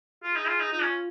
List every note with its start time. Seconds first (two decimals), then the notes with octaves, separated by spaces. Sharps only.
0.23 F4 G#4
0.35 D#4
0.47 F4
0.60 D#4
0.72 D#4 F4
0.83 C#4